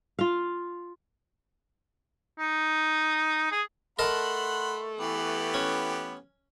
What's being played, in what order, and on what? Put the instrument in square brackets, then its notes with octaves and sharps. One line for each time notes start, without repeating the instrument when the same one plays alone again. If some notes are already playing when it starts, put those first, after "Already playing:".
[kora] F4 F5
[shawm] D#4
G#4
[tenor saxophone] A3 [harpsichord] A#4 D#5 A5 [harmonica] F#5 B5 C6
[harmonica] E3 B3 G4
[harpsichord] C#4